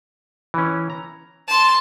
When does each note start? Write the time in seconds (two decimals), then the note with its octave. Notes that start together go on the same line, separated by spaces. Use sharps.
0.54 E3 C#4
0.90 A#5
1.48 A5 C6